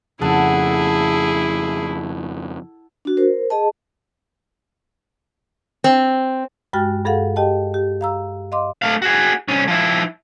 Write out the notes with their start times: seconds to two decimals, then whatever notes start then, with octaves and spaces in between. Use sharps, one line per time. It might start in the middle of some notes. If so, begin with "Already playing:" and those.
0.21 F2 C#3 E4 G#4 A4 F#5 A5
3.05 D4 F#4
3.17 A#4 C5
3.50 G#4 D#5 A5
5.84 C4
6.73 G2 G#3 F#4 G5 F6 A6
7.05 G2 G#4 A4 F5 F#5
7.36 G4 D#5 G5 A5
7.74 G4
8.01 F5 A#5 E6
8.52 D#5 F5 C6 D6
8.82 A3 F5
9.02 F#4 G#4
9.48 C2 C#4
9.68 F3 E4